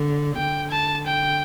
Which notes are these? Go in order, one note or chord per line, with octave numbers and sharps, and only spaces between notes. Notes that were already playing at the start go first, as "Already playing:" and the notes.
Already playing: D3
D3 G5
A5
G5